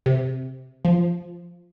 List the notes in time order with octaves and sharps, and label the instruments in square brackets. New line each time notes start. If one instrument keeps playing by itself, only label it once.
[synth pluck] C3
F3